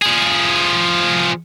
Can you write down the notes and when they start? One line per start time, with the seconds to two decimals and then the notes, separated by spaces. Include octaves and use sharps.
0.02 F3 G#4